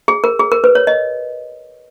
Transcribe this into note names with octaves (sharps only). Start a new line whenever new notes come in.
G#4
A#4
G#4
A#4
B4
C#5
D#5